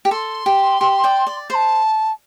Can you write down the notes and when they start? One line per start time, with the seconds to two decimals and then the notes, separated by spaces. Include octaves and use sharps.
0.05 G4
0.11 A4 C6
0.46 G4
0.81 G4
1.04 D5 G5
1.27 D5
1.50 C5 C6
1.54 A5